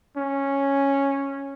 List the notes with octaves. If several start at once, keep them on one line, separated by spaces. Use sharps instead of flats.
C#4